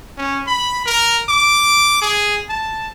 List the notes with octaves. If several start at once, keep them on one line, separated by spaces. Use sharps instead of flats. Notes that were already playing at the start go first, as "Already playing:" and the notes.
C#4
B5
A#4
D6
G#4
A5